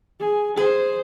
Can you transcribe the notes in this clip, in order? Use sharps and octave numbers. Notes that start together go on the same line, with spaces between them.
G#4
G#4 C5